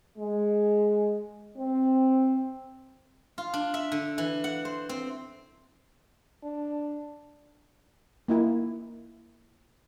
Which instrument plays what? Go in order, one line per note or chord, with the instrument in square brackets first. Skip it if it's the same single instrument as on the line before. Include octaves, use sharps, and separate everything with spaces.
[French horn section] G#3
C4
[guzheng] F4
D4
E5
D3
E3
F#5
C5
C4
[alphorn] D4
[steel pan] A#3 D#4 E4